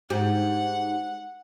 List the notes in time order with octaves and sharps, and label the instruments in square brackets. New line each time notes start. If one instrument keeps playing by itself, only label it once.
[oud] G#2 G4 [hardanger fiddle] F#5